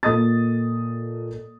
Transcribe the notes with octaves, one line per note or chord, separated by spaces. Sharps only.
A#2 A4 D#5 D#6 A6